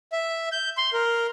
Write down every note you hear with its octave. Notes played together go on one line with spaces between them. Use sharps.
E5
G6
C6
A#4